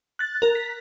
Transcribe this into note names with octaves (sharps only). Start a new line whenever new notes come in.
F#6 A6
A#4
B6